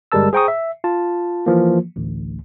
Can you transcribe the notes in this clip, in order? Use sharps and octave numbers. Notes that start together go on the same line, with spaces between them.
G1 G3 G#3 A#4 A5 E6
G#4 C5 G5 A#5 C#6 D#6
E5
F4 A5
E3 F3 A#3
A1 D2